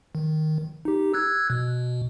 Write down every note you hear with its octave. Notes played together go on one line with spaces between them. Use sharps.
D#3
D#4 G4
E6 F#6 G#6
B2